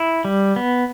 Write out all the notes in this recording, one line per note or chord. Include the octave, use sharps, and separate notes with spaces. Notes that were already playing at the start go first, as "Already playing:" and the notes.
Already playing: E4
G3
B3